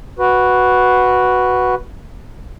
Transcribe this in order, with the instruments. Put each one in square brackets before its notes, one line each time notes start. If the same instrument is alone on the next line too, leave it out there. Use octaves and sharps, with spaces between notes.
[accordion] F#4 B4